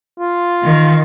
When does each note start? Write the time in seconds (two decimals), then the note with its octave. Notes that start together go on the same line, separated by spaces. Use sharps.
0.19 F4
0.63 D#3